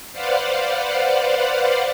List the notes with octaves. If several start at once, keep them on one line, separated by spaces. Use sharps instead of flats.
B4 C5 D5 F5 F#5